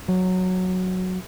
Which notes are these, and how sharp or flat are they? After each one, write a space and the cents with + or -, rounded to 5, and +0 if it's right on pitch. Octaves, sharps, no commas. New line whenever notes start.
F#3 -5